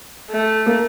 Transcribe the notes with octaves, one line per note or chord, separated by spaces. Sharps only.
A3
A#3